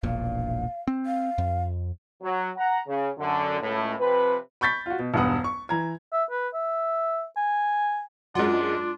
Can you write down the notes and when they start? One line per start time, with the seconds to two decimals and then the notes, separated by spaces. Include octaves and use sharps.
0.03 E1 A#1 A#2 F5
0.87 C4
1.06 F5
1.38 F2
2.22 F#3
2.57 F#5 A#5
2.87 C#3
3.18 F#2 D3
3.60 C#2 A2
3.99 C3 F3 C4 B4
4.61 B5 C#6 G6 A6 B6
4.86 F4 F#4
4.99 B2
5.14 E1 B1 G2 B3 F#5 D#6
5.44 C#6
5.69 E3 A#5 G#6
6.13 E5
6.31 B4
6.54 E5
7.37 G#5
8.35 F#2 F#3 G#3 D4 F4 F#5